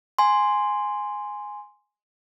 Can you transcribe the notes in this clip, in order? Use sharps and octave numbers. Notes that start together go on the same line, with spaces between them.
G#5 C6